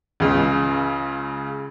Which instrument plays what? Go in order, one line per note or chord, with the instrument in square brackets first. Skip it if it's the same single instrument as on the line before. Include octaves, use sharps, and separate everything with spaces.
[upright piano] C#2 C#3